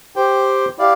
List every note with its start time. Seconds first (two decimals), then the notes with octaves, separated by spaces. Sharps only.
0.16 G4 C5 G5
0.78 E4 G4 D5 F5